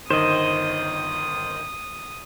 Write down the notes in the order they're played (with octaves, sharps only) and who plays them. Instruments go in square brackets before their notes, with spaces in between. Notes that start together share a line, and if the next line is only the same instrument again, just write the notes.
[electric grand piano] G1 D#3 [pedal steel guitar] C5 D#5 [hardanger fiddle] D#6